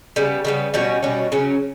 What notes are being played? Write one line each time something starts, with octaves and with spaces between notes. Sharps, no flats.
C#3 G3 B3
C#3 G3 B3
B2 G3 C#4 F#4
B2 G3 C#4 F#4
C#3 F#3 C#4